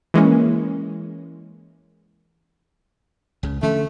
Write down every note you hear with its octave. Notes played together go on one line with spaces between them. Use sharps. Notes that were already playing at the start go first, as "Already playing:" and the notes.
E3 G#3 A#3 C#4
C#2 C#3
D3 F3 A3 C#4